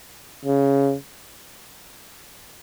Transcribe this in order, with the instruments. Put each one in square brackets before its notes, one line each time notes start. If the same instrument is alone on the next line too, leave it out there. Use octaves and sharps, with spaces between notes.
[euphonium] C#3